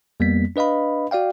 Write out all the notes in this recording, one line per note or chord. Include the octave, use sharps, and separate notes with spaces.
F2 G3 A#3 B3 B6
D4 B4 D#5 F5 B5
F#4 D5 F5 G5